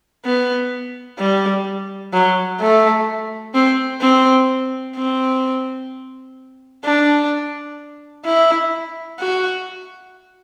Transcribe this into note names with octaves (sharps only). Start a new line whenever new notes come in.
B3
G3
F#3
A3
C4
C4
C4
D4
E4
F#4